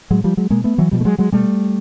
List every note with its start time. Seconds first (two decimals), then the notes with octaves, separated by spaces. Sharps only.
0.10 A2 F#3 G#3
0.24 F3 G3
0.37 F#3 G#3
0.50 B2 G#3 A#3
0.64 A3 B3
0.78 E3 F#3
0.91 B2 F3 G3
1.01 A3
1.05 F#3 G#3
1.18 F#3 G#3
1.32 B2 G3 A3